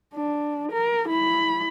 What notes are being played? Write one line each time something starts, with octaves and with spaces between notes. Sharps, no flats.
D4
A#4
E4 B5